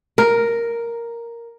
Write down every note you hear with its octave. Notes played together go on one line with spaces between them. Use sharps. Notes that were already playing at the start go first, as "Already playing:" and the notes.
A#4